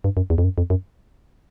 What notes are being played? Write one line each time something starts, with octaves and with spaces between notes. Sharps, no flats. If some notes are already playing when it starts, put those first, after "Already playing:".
G2
F#2
E2
F2
F#2
F2
F#2